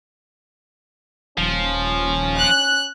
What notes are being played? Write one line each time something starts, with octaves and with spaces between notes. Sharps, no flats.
D#1 F3 C#4
F#6